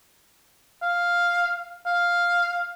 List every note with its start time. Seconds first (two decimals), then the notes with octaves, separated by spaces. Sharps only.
0.82 F5
1.86 F5